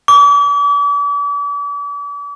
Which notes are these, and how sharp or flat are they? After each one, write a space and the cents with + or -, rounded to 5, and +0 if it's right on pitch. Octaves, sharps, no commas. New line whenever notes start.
D6 -40